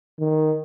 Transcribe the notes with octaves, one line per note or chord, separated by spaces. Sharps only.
D#3